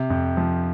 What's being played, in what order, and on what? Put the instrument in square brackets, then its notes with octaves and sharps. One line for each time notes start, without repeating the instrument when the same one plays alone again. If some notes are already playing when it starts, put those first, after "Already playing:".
Already playing: [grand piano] C3
F2
F3